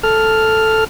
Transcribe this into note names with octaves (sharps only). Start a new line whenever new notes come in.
A4 F6